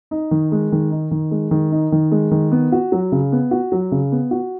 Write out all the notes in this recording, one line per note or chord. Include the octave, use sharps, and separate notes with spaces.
D#4
D#3
G#3
D#3
D#4
D#3
G#3
D#3
D#4
D#3
G#3
D#3
B3
F#4
F#3
C#3
B3
F#4
F#3
C#3
B3
F#4